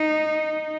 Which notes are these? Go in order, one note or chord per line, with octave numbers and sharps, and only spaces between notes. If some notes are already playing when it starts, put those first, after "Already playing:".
Already playing: D#4